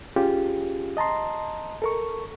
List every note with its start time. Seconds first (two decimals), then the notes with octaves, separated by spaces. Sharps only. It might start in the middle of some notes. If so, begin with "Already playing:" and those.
0.16 C#4 F4 G4 G#4
0.97 D#5 A5 A#5 C6
1.82 A4 A#4 C#6